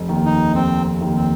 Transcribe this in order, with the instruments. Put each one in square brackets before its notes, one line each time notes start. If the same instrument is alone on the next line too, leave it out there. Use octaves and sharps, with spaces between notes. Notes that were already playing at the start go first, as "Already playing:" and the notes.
Already playing: [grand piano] F1
D#2 D#3
[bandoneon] D#4
[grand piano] F1 [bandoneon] C4
[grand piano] D#2 D#3
[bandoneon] C4